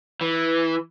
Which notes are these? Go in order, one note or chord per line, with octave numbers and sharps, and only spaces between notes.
E3